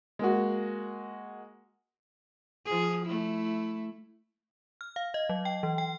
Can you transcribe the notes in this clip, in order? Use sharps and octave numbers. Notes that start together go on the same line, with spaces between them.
G#3 A#3 F#4
F3 G#4
A3 E4
F6
F5
D#5
F#3
G5
E3
G5